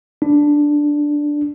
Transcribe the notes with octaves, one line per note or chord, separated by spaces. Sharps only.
D4